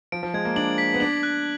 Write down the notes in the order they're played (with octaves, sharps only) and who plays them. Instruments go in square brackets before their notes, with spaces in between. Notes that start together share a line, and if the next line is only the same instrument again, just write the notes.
[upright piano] F3 [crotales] D7
[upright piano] F3
[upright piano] G#3 [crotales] G#6
[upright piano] A#3
[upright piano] D4 [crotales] F#7
[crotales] B6
[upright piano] B3
[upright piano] D4 [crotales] F#7
[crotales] F#6